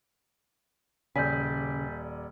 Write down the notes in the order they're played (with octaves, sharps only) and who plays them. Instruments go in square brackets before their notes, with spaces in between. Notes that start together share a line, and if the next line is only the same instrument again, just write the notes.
[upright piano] D#1 D5 G#5 [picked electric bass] C#3 [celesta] G6 B6